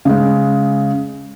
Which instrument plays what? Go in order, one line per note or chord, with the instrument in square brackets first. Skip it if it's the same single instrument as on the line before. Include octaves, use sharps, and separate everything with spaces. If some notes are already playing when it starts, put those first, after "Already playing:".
[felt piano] C#3 G#3